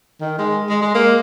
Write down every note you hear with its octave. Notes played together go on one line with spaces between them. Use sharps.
D#3
G#3
G#3
G#3
A#3